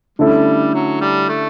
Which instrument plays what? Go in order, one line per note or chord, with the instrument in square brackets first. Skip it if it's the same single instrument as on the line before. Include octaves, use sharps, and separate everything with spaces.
[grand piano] D3 A3 C#4 E4 A4 [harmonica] G3
[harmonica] F#3
G3
A3